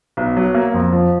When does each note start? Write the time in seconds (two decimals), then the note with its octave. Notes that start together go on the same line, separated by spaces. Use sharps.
0.17 B1
0.37 F#3
0.55 A#3
0.74 F2
0.93 F3